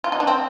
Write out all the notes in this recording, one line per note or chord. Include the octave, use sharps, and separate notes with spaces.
F4
D#4
D4
C4